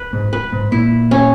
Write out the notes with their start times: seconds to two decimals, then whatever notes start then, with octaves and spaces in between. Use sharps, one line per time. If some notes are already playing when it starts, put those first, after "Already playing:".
Already playing: B4
0.13 G#2
0.33 B4
0.52 G#2
0.71 A#2 E4
1.11 C#4